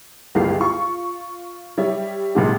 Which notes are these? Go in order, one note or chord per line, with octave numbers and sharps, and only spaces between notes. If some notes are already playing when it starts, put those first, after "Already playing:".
G1 C#2 A#3 F4 G4 C7
F4 C#6
G3 C#5 E5
G#1 A#2 G4